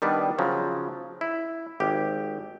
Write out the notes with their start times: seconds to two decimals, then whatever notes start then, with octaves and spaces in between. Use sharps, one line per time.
0.02 D#3 G3 B3 D4 B4
0.38 C#3 F3 F#3
1.21 E4
1.80 G#1 G4